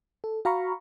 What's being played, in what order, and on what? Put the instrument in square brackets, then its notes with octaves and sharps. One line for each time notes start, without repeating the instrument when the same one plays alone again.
[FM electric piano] A4
F#4 F5 A#5 B5 C#6